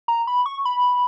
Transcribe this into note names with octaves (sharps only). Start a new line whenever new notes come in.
A#5
B5
C#6
B5